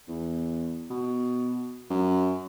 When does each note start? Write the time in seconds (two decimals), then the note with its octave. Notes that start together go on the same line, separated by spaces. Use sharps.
0.08 E2
0.90 B2
1.90 F#2